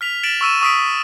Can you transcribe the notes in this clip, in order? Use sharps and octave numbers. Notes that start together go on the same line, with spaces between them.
F6 B6 F7
A6 B6 D7 E7 F#7
C#6 E6 D#7 E7
C#6 D#6 B6 D7